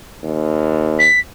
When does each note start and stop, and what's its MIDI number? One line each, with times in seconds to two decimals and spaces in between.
0.23 1.07 39
0.99 1.20 95